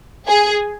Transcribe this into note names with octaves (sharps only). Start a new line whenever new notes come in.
G#4